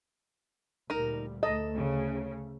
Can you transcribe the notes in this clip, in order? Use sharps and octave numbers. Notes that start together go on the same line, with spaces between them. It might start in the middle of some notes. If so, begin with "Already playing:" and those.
D2 A#2 G3 D#4 A#4
D2 A3 A4 D#5
C#3